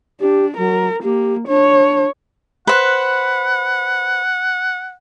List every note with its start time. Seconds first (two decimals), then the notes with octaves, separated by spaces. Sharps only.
0.21 D4 G4
0.57 F#3 A#4
1.04 A#3 G4
1.48 D4 C#5
2.67 B4 C5 F#5